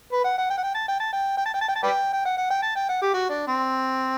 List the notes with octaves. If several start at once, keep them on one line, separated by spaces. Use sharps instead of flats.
B4
F#5
F#5
G5
F#5
G5
A5
G5
A5
G5
G5
A5
G5
A5
G5
A5
B4 D5 G5
G5
F#5
F#5
G5
A5
G5
F#5
G4
F#4
D4
C4